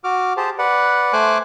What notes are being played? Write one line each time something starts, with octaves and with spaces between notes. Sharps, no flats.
F#4 D6 F6
G4 G#4 C5 A5
B4 D5 F#5
A3 C5 G#5 D6 F#6